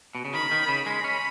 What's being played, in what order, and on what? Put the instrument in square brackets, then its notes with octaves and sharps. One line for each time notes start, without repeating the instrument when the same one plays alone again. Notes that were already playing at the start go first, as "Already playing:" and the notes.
[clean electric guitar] B2
C#3
[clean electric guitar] D#3 [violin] B5
[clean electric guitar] D#3
C#3
[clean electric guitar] G#3 [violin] B5
[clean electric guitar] C#4